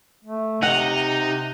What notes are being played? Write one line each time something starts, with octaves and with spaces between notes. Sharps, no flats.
A3
C3 D#4 F#5